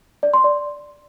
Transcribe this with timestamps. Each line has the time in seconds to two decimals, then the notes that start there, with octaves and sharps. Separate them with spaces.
0.23 D5
0.34 C6
0.44 D5